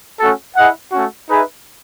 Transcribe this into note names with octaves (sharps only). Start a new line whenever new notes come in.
A3 C#4 F#4 A4
E4 G#4 D#5 F#5
A3 C#4 F#4
D#4 G#4 B4 E5